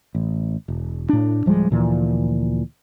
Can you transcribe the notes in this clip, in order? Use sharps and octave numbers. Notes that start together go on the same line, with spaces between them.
A1
E1
A2 D4
D1 F3 G3 G#3
D2 A#2 E3 F3